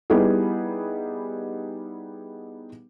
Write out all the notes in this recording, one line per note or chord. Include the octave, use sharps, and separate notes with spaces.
G3 B3 D#4 E4 G4 G#4